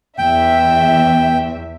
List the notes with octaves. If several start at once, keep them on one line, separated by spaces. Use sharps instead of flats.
E2 E5 G5